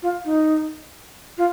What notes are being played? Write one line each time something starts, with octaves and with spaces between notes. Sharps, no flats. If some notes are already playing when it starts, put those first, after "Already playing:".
F4
D#4
F4